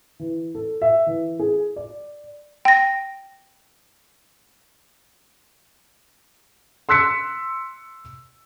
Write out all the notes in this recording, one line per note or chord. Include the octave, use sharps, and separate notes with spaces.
E3
A4
E5
E3
G#4
D5
G5 A#6
C6 E6 F#6 B6 C#7